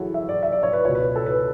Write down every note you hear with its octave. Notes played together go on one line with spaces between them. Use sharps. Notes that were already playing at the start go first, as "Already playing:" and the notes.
Already playing: F#2 E3 E4 F#4 G#4 A4 C#5
E5
D5
E5
D5
C#5
B4
C#2 B2 C#5
B4
A4
B4